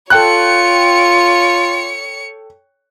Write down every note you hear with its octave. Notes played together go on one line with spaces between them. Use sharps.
F4 A4 C#5 G5 F#6 C#7